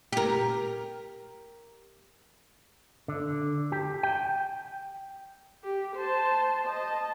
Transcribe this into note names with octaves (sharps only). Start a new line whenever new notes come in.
G4 A#4
D3
G4
G5
G4
C5 A5
D#5 A5